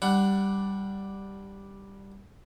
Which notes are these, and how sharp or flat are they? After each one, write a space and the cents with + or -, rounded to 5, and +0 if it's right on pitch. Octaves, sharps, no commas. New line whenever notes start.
G3 +0 D4 +0 F#5 +15